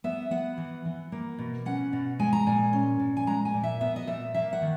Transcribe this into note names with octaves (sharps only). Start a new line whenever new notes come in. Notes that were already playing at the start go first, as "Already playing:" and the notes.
B3 E5
B3 F#5
E3
E3
A#3
B2
C#4 F#5
B2
G#3 G#5
A#5
A#2 G#5
C#4
A#2
G#5
G#3 A#5
G#5
A#2
E5
B3 E5
D#5
A#2 E5
A#3 E5
F#5
D#3